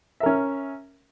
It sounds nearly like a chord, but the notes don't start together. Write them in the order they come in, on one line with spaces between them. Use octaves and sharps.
E5 A#4 C#4